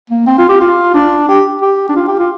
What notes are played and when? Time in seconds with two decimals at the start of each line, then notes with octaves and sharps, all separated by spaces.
0.10 A#3
0.26 C4
0.38 F4
0.49 G4
0.60 F4
0.94 D4
1.28 G4
1.62 G4
1.89 D4
1.96 F4
2.08 G4
2.19 F4